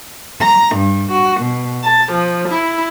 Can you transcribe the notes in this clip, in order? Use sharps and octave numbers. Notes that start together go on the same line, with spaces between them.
A#5
G2
F#4
B2
A5
F3
E4